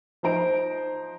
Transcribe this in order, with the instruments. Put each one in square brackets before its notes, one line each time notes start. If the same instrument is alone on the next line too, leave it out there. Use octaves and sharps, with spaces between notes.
[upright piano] F3 D#4 C5 A#5 D7